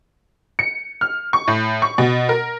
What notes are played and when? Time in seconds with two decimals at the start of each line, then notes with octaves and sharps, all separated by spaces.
0.59 C#7
1.01 F6
1.33 C#6
1.48 A2
1.82 C#6
1.98 B2
2.29 A#4